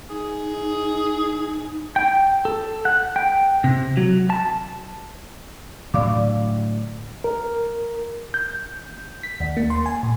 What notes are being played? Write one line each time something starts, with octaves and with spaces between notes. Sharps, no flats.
D#4 G#4
G5
A4
F#5
G5
C3
F#3
A5
A2 D3 F#3 D5 F5 D6
A#4
G6
B6
D#2
A#3
C6
G#5
A#2